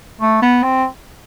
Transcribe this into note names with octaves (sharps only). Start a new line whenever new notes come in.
A3
B3
C4